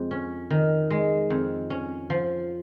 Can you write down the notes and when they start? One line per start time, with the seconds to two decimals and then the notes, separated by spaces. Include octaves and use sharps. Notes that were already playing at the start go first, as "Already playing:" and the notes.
Already playing: F2 G#3
0.11 C#4
0.50 D#3
0.90 G#3
1.30 F2
1.70 C#4
2.10 F3